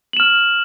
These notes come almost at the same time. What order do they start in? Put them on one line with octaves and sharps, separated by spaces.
F#7 E7 F6